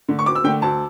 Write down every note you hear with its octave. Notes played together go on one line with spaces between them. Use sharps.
D3 A3
C#6
D2 D6
E6
D3 A3 G5
D2 A5